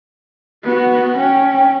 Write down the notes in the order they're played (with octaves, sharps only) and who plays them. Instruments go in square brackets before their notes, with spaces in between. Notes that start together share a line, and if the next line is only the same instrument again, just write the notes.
[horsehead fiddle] B3 F#4
[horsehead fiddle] C#4 [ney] G5